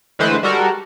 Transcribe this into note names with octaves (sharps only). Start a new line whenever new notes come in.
D3 E3 G#3 A3 B4 C5
G3 G#3 F#4 A4 A#4